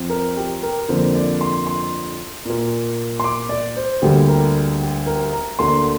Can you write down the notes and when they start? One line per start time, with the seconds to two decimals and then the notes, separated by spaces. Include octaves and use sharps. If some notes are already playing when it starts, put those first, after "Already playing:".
Already playing: F2 F3 C4
0.10 A#4
0.37 G4
0.63 A#4
0.89 F2 D3 F3 A#3 C5
1.15 D5
1.41 C6
1.67 C6
2.45 A#2 A#3
3.20 C6
3.24 D6
3.49 D5
3.76 C5
4.02 D2 D3 G3 A#3 G4
4.28 A#4
4.81 G4
5.06 A#4
5.33 A#5
5.59 D2 D3 A#3 C6